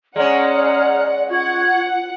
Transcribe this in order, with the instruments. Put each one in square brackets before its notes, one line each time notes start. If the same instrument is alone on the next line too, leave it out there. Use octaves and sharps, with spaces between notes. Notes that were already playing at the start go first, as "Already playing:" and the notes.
[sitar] G#3 C#4 [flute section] G#4 A#5 F6 [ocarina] D5 [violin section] F#5
[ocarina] F4 [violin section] F#5 [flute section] C#6 G#6